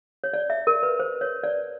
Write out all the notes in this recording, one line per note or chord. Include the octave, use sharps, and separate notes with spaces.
C#5
D5
E5
A#4
B4
C5
C#5
D5